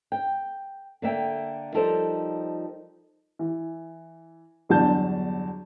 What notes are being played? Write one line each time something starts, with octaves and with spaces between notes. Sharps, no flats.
G5
D3 A#3 E5 G5
F3 G3 D#4 A4 A#4 C5
E3
G1 E2 F#3 D4 A5 G6